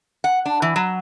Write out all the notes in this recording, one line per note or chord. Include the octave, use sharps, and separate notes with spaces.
F#5
D4
E3
F#3